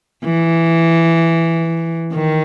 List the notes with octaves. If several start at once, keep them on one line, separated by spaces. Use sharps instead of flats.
E3
D#3